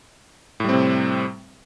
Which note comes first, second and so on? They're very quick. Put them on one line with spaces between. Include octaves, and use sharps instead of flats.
A2 G3 C4 C3